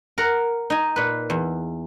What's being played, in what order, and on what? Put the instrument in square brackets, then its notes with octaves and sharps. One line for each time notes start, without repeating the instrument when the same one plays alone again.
[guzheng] A#4 F#5
D#4 G#5
A#2 B4
E2